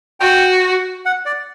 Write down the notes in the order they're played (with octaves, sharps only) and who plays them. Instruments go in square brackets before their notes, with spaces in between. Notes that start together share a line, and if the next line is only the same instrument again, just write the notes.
[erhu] F#4 [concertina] G5
[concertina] F#5
D5